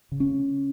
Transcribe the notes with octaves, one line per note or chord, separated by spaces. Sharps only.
C#3
C#4